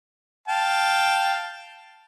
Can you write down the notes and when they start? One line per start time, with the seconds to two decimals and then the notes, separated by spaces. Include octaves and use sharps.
0.48 F5 G5 A5